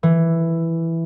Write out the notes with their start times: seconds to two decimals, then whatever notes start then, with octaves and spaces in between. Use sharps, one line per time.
0.03 E3